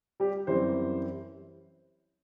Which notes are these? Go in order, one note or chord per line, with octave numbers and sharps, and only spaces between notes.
G3 G4
F#2 E3 G3 C4 C5